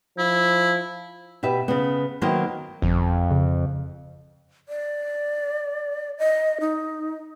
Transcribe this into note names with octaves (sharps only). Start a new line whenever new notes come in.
F3 E4
B2 G4 B4 E5
C#3 B3
D#3 F#3 A#3 B3 F#4 C5
G1 F2
C#3
D5
D#5
D#4